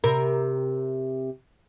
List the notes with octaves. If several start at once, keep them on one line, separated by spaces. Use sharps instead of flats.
C3 A#4